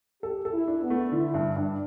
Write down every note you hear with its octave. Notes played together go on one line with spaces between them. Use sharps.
G4 A4
A4
E4
D4
B3
A3
D3 E4
G2
G2 D4